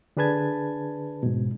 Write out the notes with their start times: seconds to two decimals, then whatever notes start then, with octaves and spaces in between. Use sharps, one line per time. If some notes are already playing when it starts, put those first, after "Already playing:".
0.17 D3 D4 G#4 B4 A5 G#6
1.23 G#2 B2